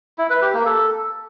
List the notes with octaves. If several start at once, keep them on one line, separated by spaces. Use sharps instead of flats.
E4
B4
G4
A#3
A4